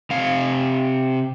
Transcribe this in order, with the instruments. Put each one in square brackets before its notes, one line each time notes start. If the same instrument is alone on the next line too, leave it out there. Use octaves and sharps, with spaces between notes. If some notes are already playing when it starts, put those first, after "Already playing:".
[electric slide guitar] C3 F5